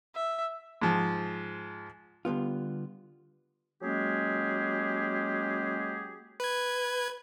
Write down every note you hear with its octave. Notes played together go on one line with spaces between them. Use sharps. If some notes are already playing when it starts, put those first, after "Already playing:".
E5
G#2 F3
D3 G3 B3 F4
F#3 G#3 A#3 C#4 G4 G#4
B4 G#6